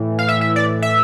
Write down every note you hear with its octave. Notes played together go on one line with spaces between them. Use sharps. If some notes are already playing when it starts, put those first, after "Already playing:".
Already playing: A2 E3
F5
E5
E5
D5
E5